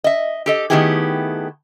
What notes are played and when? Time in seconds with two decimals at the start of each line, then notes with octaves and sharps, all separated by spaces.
0.04 D#5 E5
0.46 G4 A4 D#5
0.70 D#3 A3 B3 E4 G4 G#4